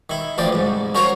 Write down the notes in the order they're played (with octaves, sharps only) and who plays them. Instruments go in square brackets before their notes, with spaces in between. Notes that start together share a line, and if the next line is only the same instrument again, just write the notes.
[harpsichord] D#3 E4
D2 E3 F3 D5 G5
C2 G#2
C#4 F#4 A#4 C5 C#5 F5